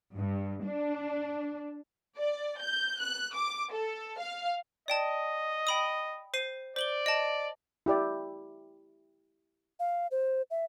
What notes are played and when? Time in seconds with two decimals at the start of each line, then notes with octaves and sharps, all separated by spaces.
0.15 G2
0.66 D4
2.18 D5
2.61 G6
3.00 F#6
3.34 D6
3.73 A4
4.19 F5
4.88 D5 D#5 G5 A5
5.67 G5 B5 D#6
6.34 C5 C7 D#7
6.76 C5 D5 F#7 G7
7.06 D#5 A5
7.86 E4 G4 D5 E5
9.80 F5
10.11 C5
10.51 E5